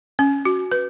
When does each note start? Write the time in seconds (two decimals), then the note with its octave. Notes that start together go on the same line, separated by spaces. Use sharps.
0.19 C#4
0.45 F#4
0.72 B4